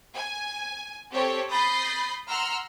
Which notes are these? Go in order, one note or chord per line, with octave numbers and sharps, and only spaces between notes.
G#5
C4 G4 A4 C#5
B5 D#6 G6 A6 A#6 C7
F#5 A#5 C6 E6 F6